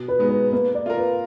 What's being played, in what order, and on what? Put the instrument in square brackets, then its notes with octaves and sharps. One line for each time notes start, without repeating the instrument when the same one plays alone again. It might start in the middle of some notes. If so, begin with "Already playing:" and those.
Already playing: [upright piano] B2
[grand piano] B4
[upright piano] G#3 B3 D#4 G#4
[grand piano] B4
[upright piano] A#3 [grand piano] B4
[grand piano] D5
[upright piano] F4 A#4
[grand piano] B4